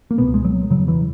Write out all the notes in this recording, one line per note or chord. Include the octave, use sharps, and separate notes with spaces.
A#3
C#2 B2 B3
G#3
F#3
E1 D#2 C#3 F#3
E3